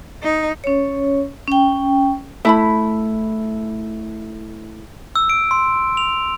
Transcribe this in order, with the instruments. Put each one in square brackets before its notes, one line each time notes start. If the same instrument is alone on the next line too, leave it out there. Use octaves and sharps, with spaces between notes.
[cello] D#4
[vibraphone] C#4 C#5
C#4 G5
[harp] A3 E4 [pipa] E5 A5 B5
[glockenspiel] E6
D7
C6
F7